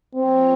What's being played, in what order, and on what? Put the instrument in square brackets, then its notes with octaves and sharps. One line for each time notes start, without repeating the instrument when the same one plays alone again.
[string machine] F3 A#3 F4 A#4 C#5 [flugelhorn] C4